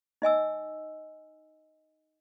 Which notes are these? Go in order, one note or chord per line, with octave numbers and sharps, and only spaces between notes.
D#4 D#5 G#5 E6